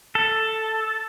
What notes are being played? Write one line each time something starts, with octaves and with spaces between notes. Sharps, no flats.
A4